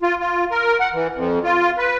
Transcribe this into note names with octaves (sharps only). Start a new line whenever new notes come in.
F4
F4
A#4
F#5
E3
F2
F4
B4